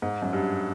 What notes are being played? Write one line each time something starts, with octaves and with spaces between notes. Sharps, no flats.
G#2
F#2
G2